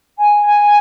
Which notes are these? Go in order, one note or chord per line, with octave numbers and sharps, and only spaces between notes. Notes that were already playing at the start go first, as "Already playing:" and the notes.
G#5
G#5